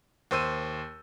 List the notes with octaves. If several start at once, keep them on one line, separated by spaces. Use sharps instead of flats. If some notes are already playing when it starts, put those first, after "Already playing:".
D#2 C5 E6 D#7